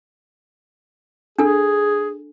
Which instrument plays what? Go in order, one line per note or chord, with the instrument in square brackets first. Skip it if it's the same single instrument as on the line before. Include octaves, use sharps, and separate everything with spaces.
[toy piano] D4 A4 [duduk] G#4